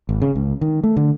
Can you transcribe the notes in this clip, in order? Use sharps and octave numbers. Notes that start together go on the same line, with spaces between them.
G#1
C#3
C#2
D#3
A3
D3